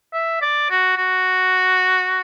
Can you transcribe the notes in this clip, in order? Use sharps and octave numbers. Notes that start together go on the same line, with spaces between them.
E5
D5
F#4
F#4